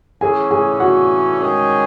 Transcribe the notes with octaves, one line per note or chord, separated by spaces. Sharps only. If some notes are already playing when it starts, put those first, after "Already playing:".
E3 A3 C#4 G#4 G#5
G#4 G#5
F#4 F#5
D#3 G#3 C#4 G#4